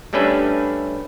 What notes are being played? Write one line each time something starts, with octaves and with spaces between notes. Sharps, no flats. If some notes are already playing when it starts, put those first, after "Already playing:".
G3 A3 C#4 D4 B4 E5